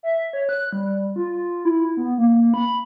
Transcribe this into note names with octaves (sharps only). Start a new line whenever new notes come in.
E5
C#5
F#6
G3
F4
E4
B3
A#3
B5